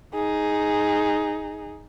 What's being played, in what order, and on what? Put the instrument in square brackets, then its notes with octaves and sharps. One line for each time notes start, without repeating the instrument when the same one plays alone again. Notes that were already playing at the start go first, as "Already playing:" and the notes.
[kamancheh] D#4 G#4